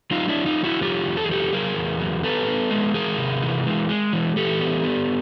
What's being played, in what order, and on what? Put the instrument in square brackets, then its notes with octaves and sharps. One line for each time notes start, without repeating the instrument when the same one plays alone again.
[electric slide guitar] F#3 D#4 F4
D4 E4
F#3
D#4 F4
E2
E4 F#4
F#3 F4 G4
E2
A4
G#4
F#3 G4 A4
F#3 G#4 A#4
E2
F#3
B3 A4 B4
B3
G#3
E3 G#4 A#4
C3
E3
G#3
G#3
E3
E3 G4 A4
B3
B3